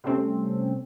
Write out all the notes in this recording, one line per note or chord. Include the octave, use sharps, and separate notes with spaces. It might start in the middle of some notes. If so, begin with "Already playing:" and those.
C3 G3 A3 C4 C#4